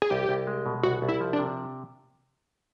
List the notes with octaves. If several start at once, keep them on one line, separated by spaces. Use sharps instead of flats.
G#4
C2 G4
C2
G#3
B2
C2 F#4
C2
E4
F3
D4
C3